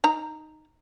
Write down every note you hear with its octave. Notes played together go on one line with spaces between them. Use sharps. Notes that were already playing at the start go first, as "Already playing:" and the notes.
D#4 A#5